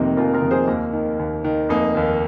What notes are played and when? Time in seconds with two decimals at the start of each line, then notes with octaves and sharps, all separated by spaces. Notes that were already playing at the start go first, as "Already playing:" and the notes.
Already playing: F1 F2 C3 D#3 A#3 D#4
0.17 F1 F4 A#4
0.34 F4 A#4
0.42 F2 C3 D#3
0.51 G#4 C5
0.67 D#2 A#3
0.93 D#3
1.19 D#2
1.44 D#3
1.69 F1 A#3 D#4
1.95 D#2 D#3